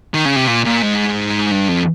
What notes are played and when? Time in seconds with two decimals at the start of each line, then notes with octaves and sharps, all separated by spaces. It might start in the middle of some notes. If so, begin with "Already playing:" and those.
0.14 D#3
0.25 C#3
0.36 C3
0.47 A#2
0.65 A#2
0.82 G#2
1.51 G2
1.69 F2